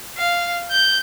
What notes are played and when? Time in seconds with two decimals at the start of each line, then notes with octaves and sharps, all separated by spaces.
0.18 F5
0.71 G6